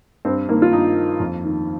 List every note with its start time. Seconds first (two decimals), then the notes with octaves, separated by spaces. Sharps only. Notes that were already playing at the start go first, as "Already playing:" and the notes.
0.25 G2 C4
0.49 D#3 A#3
0.62 F4
0.73 G2 D#4
0.96 D#3
1.20 F2
1.44 D#3